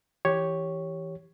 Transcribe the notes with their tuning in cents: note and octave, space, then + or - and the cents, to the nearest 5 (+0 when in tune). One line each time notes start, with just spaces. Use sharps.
E3 +0 G4 +0 C#5 +0